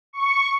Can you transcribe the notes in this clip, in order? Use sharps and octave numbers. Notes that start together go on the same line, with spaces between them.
C#6